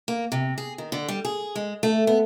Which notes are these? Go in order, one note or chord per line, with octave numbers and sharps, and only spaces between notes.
A#3
C3
G#4
D#3
D3
G3
G#4
G#3
A3
B3